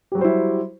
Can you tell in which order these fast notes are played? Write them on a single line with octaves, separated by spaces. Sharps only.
G4 F#3 G3 C5 E4